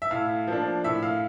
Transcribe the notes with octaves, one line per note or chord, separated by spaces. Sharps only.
E5
A2 F5
F3 A#3 D4
A2 E5
F5